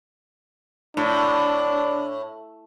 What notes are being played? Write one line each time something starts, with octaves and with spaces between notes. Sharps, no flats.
A2 D4